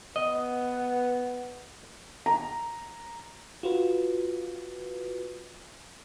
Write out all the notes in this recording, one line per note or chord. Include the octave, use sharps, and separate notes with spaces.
B3 D#5
A#5
F4 F#4 B4